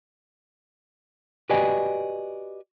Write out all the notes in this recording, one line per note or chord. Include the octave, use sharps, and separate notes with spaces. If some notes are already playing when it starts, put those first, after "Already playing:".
F#4 G4 B4 D5 D#5 G#5